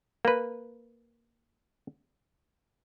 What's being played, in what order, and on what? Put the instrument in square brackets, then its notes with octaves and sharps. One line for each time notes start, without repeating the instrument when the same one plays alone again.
[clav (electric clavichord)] A#3 B4